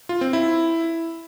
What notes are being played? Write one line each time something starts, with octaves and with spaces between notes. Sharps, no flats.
F4
C4
E4